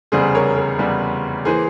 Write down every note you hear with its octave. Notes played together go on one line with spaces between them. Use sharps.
F1 E2 C#3 G3 G#4 C5
A#4 C#5
A#4
F1 E2 C#3 G3
E3 A#3 G#4 C5